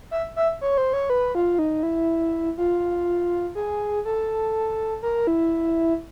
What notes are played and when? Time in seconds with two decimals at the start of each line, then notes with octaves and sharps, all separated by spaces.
0.11 E5
0.36 E5
0.61 C#5
0.78 C5
0.93 C#5
1.10 B4
1.35 F4
1.59 D#4
1.83 E4
2.58 F4
3.55 G#4
4.05 A4
5.02 A#4
5.27 E4